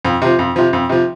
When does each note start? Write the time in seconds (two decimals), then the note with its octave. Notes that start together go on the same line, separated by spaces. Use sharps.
0.05 F2
0.22 C3 F3
0.39 F2
0.56 C3 F3
0.73 F2
0.89 C3 F3